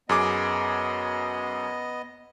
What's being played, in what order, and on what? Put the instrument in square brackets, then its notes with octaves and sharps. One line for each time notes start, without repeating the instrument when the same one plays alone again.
[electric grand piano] F#2 G#4 D6 [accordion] B3 D#5